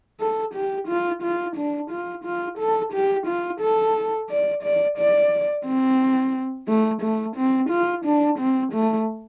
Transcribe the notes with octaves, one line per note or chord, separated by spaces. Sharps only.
A4
G4
F4
F4
D4
F4
F4
A4
G4
F4
A4
D5
D5
D5
C4
A3
A3
C4
F4
D4
C4
A3